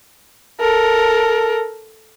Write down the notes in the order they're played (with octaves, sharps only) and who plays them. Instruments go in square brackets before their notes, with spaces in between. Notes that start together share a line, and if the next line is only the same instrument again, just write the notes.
[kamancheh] A4 A#4